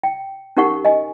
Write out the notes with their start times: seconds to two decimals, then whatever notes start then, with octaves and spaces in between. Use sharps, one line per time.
0.03 G5
0.57 C#4 D#4 G4 A#4 F#5 C#6
0.85 D#5 G#5